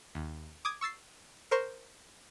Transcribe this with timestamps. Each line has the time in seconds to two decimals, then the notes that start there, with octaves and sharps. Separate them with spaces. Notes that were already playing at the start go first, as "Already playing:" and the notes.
0.15 D#2
0.65 D6 D#6 G#6
0.81 C#6 E6 A6 C7
1.51 A#4 C5 C#6 C7